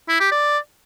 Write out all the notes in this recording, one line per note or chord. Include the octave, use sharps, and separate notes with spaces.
E4
G4
D5